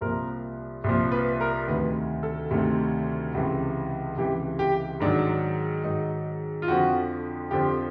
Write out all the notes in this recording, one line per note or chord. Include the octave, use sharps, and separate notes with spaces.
C2 A#2 F3 A#4
C2 A#2 F3
B4
A#4
D2 C3 D#3 B4
A4
D2 C3 D#3
C#2 C3 E3
C#2 C3 E3 G4
G4
G#2 D#3 F#3 D4
G#2 D#3 F#3 D#4
F4
F2 D3 F3 F#4
F2 D3 F3 G4